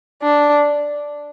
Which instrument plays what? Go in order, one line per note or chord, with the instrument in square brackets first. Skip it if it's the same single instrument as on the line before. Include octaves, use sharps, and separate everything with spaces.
[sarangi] D4